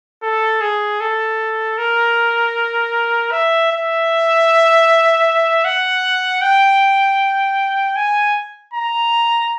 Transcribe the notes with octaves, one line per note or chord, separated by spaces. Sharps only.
A4
G#4
A4
A#4
E5
E5
F#5
G5
G#5
A#5